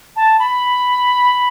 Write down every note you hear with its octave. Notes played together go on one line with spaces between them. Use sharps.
A5
B5